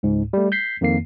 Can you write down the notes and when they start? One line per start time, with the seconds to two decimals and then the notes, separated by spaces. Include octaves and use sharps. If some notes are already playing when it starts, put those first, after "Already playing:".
0.03 C#2 G#2
0.33 G3 A3
0.52 G6 B6 C7
0.81 F2 D#3 A#3 C7